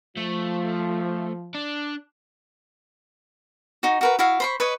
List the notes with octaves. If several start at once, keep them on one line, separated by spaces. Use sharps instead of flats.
F3 A3
D4
D#4 F#4
F#4 A#4 B4
E4 F#4 F5
C5 B5 C#6
B4 C#5 D#5